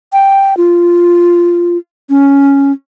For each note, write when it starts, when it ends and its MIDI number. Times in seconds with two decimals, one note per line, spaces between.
0.13 0.57 79
0.57 1.78 65
2.10 2.72 61